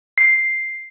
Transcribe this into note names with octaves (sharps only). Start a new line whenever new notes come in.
C7